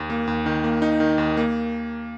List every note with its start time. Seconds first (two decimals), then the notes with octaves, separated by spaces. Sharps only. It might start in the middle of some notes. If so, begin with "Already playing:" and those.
Already playing: D#2
0.10 A#3
0.27 D#2
0.46 D#3
0.64 A#3
0.82 D#4
1.00 D#3
1.18 D#2
1.37 A#3